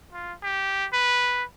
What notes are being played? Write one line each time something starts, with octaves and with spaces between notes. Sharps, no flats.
F4
G4
B4